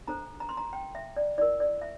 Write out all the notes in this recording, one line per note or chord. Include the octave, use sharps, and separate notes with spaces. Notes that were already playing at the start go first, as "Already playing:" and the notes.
D4 A4 C5 A#5
A#5
C6
A#5
G5
E5
D5
E4 A#4 D5
D5
E5